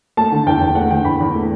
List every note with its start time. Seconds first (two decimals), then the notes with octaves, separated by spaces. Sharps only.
0.17 A3 A5
0.32 D3
0.46 E2 G5
0.61 E2
0.75 A3 F#5
0.90 D3 G5
1.05 E2 B5
1.20 E2
1.35 A3